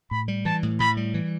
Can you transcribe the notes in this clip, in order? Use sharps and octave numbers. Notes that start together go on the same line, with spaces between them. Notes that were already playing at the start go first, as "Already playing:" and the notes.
A2 B5
G3
E3 A5
A2
A2 B5
G3
E3